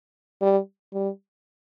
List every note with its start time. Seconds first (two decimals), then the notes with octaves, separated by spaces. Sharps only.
0.42 G3
0.93 G3